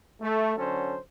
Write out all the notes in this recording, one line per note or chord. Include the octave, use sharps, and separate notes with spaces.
A3
D3 F#3 C#4 A4 C5